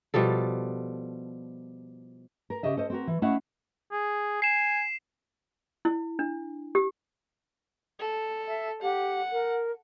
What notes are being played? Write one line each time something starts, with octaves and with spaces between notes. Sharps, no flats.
B2 F3 G3 A4
A#4
C#3 G4 D#5 E5
A4 C5 D#5
C4 F#4 A#4
E3
A3 C#4 E4 D#5 F5 F#5
G#4
G#5 C7 E7
E4
D4
G4
A4
E5
G4 F#5
A#4